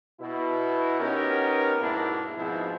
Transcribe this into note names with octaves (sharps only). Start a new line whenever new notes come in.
B2 E4
B3 C#4 D#4 G4 A#4
G#2 B2 A#3 D4 E4
G#2 B2 F3 G#3 C4 E4